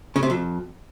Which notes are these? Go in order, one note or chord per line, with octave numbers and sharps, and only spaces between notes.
C#3
C3
F2